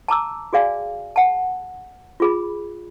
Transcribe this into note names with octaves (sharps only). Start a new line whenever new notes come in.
A5 A#5 D6 E6
F#4 G#4 D5 F5 G#5
F#5 A5
F4 G#4 B5